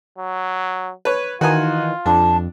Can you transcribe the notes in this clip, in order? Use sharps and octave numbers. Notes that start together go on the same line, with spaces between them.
F#3
B4 C#5
D#3 E3 D#4 F4 F#4 G#5
F2 D4 A5